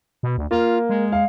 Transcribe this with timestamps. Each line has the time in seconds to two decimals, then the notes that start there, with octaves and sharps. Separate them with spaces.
0.23 B2
0.38 D2
0.51 A#3 F4
0.89 G#3
1.12 F5